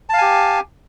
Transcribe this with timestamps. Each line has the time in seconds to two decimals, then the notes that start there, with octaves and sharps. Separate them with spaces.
0.09 A5
0.14 F5
0.18 G#5
0.22 G4